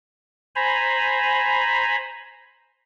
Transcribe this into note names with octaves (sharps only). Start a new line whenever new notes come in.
C5 G#5 A#5 B5